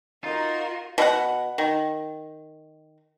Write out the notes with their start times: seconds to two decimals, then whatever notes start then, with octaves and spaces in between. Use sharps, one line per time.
0.24 D#4 F4 F#4 A#4
0.98 B2 E4 F#5
1.58 D#3